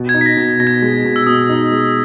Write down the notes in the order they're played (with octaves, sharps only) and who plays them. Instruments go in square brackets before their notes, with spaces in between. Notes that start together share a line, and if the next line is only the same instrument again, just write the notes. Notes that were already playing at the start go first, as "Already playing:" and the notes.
Already playing: [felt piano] B2
[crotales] G#6
[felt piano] D#4
[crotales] B6
A#6
[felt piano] B2
[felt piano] B2 [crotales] A#6
[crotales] G#6
A#6
[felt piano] G#3
B2
[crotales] E6
[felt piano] B2 [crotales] D#6
[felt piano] D#4
G#3